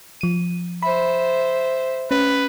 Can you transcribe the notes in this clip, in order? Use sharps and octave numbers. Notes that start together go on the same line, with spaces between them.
F3 D#7
C5 E5 B5
C#4 B4